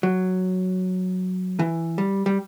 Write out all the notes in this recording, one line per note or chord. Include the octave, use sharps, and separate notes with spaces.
F#3
E3
G3
G3